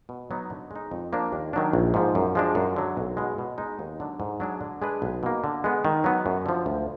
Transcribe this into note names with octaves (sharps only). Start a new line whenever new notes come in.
B2
F#3 B3 D#4
D3
G#3 D#4
F2
F3 A#3 D4
D#2
D#3 F#3 D4
A#1
G#2 F3
F#2
F3 G#3 D4
F#2
D3 F#3
B1
B2 G#3
B2
G#3 D#4
D#2
D3 F#3 D4
G#2
F#3 D4 G#4
D3
G#3 D4 G#4 B4
B1
B2 A#3
D3
G#3 B3
D#3
F#3 B3
F#2
D3 F3
D2